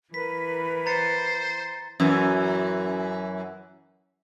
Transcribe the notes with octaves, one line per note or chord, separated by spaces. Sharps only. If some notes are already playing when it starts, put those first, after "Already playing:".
E3 A#4 B4 B5 B6
C5 A#5 A6 C#7
F#2 E3